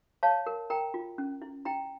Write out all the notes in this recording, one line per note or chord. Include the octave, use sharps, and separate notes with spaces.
C#5 F5 A5
A#4
A#4 G5 A#5
F4
C#4
E4
E4 G5 A#5